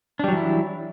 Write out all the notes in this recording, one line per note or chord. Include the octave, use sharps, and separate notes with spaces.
E3 F#3 G3 D4 E4